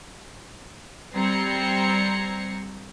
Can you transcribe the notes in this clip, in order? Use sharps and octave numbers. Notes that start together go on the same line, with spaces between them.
G3 C4 A#5 G#6 C7 C#7